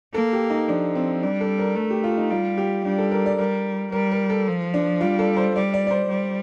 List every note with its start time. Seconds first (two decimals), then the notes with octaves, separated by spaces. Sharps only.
0.14 A#3 A4
0.33 G4
0.50 D#4
0.68 F3 D4
0.95 C4
1.23 G3 D4
1.41 A4
1.59 A#4
1.76 A3 A4
1.90 G4
2.04 F4
2.18 D#4
2.30 G3 F4
2.58 G4
2.85 G3 D4
2.98 A4
3.12 A#4
3.26 D5
3.39 G3 A#4
3.92 G3 A#4
4.12 A#4
4.30 A4
4.48 F3
4.74 D4
5.01 G3 F4
5.19 A4
5.37 C5
5.55 G3 D5
5.74 D5
5.87 D5
5.91 C5
6.09 G3